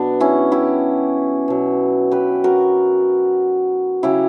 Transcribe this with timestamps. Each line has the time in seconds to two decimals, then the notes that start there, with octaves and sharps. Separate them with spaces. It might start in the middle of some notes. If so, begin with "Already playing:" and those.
Already playing: B2 F#3 B3 D4
0.20 C#4 E4
0.52 E4 G4
1.48 B2 F#3
2.11 G4 B4
2.44 F#4 A#4
4.03 C#3 F#3 E4 G4